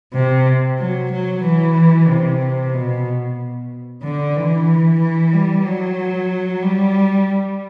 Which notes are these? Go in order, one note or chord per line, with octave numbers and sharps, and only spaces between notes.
C3
F#3
F#3
E3
C3
B2
D3
E3
E3
G3
F#3
G3